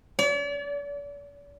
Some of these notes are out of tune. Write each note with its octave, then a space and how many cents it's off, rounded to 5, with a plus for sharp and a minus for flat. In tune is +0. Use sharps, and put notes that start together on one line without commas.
D5 -45